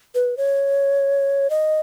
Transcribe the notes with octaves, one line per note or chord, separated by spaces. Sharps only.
B4
C#5
D#5